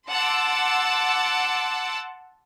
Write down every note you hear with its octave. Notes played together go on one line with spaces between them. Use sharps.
F#5 A5 C6 D6 E6